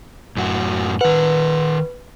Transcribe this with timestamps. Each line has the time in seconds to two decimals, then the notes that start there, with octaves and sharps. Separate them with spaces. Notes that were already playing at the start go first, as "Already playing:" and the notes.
0.37 F#2 A2 F#4
1.01 D#3 B4 F#5